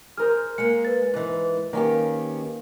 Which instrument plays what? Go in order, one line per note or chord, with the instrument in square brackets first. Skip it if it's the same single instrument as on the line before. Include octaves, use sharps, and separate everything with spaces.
[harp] G#4 A#4 C5 [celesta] F6
[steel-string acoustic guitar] G#3 A#3 [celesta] C#7
[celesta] B4 A6
[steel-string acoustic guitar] G#2 E3
[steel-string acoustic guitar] D#3 C#4 G4 [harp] A#3